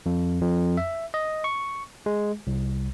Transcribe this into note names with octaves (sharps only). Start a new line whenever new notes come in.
F2
F2
E5
D#5
C#6
G#3
C2